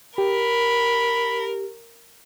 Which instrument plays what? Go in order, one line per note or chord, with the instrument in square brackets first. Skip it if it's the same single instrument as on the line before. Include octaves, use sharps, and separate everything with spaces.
[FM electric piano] G4 [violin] A#4 [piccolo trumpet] B5